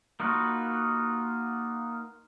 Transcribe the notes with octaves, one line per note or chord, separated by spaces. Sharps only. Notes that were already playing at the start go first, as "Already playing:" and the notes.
A#3 D#4 F4 F#4 B4